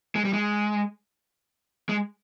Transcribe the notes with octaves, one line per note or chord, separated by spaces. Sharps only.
G#3
G3
G#3
G#3